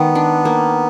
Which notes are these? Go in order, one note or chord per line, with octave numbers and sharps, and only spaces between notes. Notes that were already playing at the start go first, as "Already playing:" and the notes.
Already playing: D#3 G#3 B3
D4
A#3